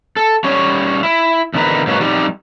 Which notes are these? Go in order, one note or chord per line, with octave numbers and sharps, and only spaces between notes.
A4
G3 C#4 C#5
E4
E2 D3 D#3 A#4 B4
G#2 F#3 A#3 B4 C#5
F2 G3 D#4 G4 D5